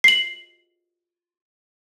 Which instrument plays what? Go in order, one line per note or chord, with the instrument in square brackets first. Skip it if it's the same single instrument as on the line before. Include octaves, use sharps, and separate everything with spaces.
[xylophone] C7 F#7